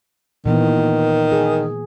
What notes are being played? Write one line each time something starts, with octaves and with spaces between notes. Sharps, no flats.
A#2 D#3 E3 B3
G#4